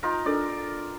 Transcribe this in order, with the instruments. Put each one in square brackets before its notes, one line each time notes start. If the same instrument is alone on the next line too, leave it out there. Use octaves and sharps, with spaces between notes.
[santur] D#4 F4 A#4
[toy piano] D4 A4 A#4 [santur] D5